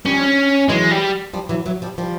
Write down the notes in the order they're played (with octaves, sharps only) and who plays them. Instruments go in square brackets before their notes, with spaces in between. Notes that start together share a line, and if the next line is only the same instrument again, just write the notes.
[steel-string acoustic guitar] F3 G3 [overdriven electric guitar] C#4
[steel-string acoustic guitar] E3 F#3 [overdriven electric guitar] G#3
[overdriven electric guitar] G3
[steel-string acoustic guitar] F3 G3
E3 F#3
E3 F#3
F3 G3
F3 G3